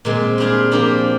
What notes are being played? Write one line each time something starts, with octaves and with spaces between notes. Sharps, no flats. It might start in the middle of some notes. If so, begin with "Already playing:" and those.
A#2 G#3 C4
G3 D4 F4 G#4
F3 A#3 D4 G4